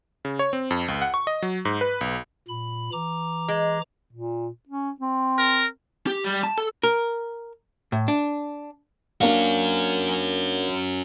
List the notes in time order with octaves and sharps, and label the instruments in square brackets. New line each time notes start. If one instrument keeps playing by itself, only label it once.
[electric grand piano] C#3
C#5
C4
F2
C#2
F#5
C#6
D#5
F#3
G#2
B4
B1
[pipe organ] A#2 B5
E3 A#5 D6
[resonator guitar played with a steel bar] G#3
[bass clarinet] A#2
C#4
C4
[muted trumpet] A#4
[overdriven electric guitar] G4
G3
A5
A4
[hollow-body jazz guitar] A#4
A2
D4
[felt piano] A#3 D4 F5 [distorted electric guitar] C#4 F#4